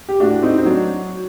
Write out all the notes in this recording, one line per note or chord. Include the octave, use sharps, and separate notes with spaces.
G4
A2 D4 F#4
C4 D#4
C4
F#3 D4